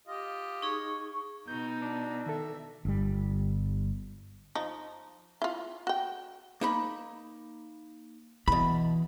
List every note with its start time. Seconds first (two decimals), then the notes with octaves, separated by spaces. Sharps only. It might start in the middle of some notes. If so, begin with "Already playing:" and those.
0.07 F4 G4 D#5
0.62 D#4 G#4 C#6
1.48 B2 D#4 G6
1.82 D4
2.26 D#3 A4 E5
2.85 G1 G3
4.55 F3 D#4
5.42 E4 F4
5.87 F#4 G5
6.61 A#3 D#4 B5
8.48 B2 E3 B5